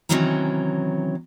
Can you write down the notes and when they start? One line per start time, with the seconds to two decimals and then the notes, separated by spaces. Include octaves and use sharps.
0.09 C3 D#3 E3 F#3 C#4 A#5